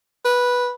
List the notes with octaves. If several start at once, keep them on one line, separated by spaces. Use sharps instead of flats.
B4